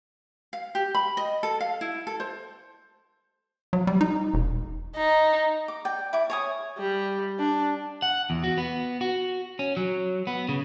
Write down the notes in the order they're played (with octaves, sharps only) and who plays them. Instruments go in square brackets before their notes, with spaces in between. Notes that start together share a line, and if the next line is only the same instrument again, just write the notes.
[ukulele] F5
G4
B5
D#5
A4
F5
E4
A4
C5
[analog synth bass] F#3
G3
D#4
E1
[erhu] D#4
[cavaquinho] D6
D5 G5
E4 D6
C#5 G#5 D#6
[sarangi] G3
D4
[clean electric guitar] F#5
E2
F#4
B3
F#4
C#4
F#3
B3
C#3